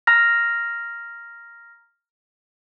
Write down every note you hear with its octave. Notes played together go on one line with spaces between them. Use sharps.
A#5 F6 A#6